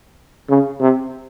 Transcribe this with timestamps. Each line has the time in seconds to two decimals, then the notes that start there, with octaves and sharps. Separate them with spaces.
0.49 C#3
0.80 C3